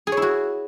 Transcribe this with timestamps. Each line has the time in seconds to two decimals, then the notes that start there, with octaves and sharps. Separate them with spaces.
0.07 G#4
0.12 C#5
0.17 E4
0.22 F#4